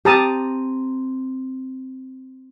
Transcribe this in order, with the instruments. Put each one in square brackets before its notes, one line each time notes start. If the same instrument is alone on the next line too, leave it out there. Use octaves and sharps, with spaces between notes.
[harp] C4 A#5 D#7 [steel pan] G4 A5 D#6